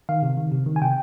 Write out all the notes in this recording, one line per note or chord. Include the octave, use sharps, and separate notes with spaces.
D#3 F5
C3
D#3
C3
D#3
G#5
C3 G5